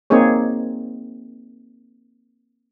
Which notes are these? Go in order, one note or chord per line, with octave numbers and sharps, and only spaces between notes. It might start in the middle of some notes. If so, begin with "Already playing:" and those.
A#3 C4 D#4 G#4 C#5